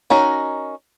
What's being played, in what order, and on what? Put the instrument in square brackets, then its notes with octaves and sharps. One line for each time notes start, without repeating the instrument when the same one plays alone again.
[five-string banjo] C#4 D#4 F#4 A#4